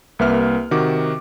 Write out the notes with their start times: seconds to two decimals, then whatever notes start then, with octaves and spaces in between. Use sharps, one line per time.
0.19 C2 A#3 B4 E5 F6
0.71 C3 D#3 F#4 D6